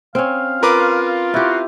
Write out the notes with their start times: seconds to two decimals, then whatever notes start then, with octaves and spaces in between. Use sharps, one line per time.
0.15 C4 C#4 F5
0.63 F4 A#4 B4 D6
1.34 E4 F#4 G4